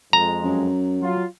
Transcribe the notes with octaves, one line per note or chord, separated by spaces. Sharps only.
F2 G#3 A#5
F#2
F#3 F4